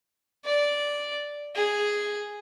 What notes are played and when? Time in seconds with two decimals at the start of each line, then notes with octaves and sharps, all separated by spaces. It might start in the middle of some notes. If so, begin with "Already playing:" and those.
0.45 D5
1.55 G#4